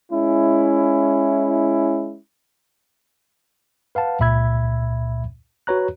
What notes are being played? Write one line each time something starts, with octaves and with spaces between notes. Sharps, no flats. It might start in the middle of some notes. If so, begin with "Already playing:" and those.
G#3 C#4 E4
B4 F5 F#5 A5
C#2 A#2 E5 B5 E6 G#6
F#4 B4 C#5 A#5 F#6